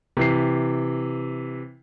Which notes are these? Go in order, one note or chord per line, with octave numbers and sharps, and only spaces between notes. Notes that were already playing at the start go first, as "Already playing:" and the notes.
C3 E3 C7